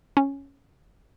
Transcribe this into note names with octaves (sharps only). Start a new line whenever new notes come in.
C#4